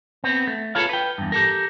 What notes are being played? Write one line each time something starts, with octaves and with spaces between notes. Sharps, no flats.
B3 C4
A3
F4 G#4 A4 B4 C#5 F5
B4 G5
E2 G2
G4 A4 A#4